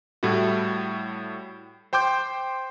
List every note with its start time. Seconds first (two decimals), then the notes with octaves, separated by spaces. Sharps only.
0.23 A2 G3 A3 E4 F#4
1.93 C5 G5 C6 D6 G6